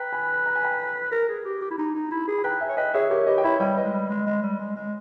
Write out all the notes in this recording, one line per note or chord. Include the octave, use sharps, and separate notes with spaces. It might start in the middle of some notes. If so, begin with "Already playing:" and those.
Already playing: B4 G5 A#5
G#5 B5
A#5
G#5
G5 A#5
A#4
G#4
G4
G4
E4
D#4
D#4
E4
G#4
B5
B4 G5 A#5
E5 G#5
C#5
B4 D#5 G5
G#4 C#5 E5
G4 A#4 C#5
G4 B4 D#5
G5
E4 C#5 E5
G3 D#5 G5
B4 D#5
G#3
G3
G#3
G#3
G3
G#3
G#3